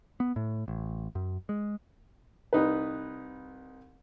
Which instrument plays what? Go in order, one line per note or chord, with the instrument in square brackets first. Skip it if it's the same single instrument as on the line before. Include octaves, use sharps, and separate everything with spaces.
[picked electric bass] B3
A2
A1
F#2
G#3
[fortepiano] C2 D#4 B4